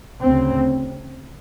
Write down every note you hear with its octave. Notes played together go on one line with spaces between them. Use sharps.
D2 C#3 C4